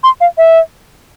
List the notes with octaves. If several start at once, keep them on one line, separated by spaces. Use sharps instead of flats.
C6
F5
E5